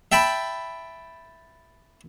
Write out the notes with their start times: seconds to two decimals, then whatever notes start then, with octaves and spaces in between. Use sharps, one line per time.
0.12 E5 G5 A5 B5